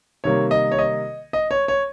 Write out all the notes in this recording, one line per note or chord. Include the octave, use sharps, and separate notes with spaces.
C3 D#3 G3 A#3 C#5
D#5
C#5
D#5
D#5
C#5
C#5